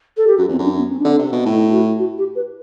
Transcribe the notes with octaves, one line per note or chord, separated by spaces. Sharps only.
A4
G4
F#2 F#4
E2 C4
F#2
D4
B3
C4
D4
D3 C4
C3
B2
A2 E4
E4
F#4
F#4
G4
B4